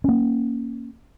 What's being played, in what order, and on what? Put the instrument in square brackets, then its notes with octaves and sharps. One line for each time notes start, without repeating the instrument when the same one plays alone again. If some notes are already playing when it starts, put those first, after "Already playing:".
[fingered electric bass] A#3 C#4